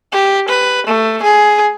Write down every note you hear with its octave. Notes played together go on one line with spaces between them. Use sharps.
G4
B4
A3
G#4